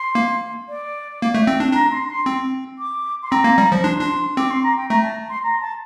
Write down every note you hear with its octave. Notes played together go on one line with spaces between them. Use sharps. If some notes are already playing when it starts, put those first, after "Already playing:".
Already playing: C6
A#3
D5
A#3
A3
C4
D4
D4 A#5
C6
C6
C4
D6
C6
C4 A#5
A#3
G3
F3
D4 C6
D4
C4 D6
C6
A#5
G5
A3 A#5
A5
C6
A#5
A5